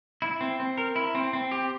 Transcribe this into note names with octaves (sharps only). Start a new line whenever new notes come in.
E4
C4
C4
A#4
E4
C4
C4
G4